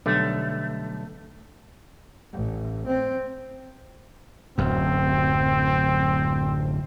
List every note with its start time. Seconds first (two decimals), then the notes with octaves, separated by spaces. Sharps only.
0.06 B1 D3 G3 A3
2.32 A1
2.87 C4
4.58 D1 F#2 C4